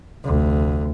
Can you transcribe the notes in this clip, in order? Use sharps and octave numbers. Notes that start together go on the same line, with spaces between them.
F1 D2